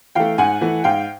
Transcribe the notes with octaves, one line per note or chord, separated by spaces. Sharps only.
E3 A3 F5 G5
G#2 F#5 G#5
E3 A3
G#2 F5 G5